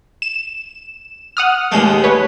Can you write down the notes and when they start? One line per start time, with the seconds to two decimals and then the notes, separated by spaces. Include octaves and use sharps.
0.22 E7
1.37 F#5 D#6 F6
1.72 D#2 G#3 A3
2.04 B4 C#5